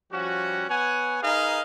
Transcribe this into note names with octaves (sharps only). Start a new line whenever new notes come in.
F3 G3 C#4 F#4
B3 C#5 F#5 G#5
D#4 G#4 A#4 B4 D#5 F5